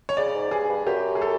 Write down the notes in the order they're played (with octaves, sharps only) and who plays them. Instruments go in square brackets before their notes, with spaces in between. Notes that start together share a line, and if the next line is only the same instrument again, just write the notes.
[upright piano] C#5
[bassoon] C#3 [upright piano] D5
[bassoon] G#2
[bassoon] G2 [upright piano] G#4
[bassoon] G2
[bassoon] F#2 [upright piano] G4
[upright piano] G#4
A4